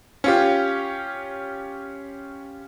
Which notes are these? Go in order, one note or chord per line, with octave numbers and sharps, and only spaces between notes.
C#4 F4 G4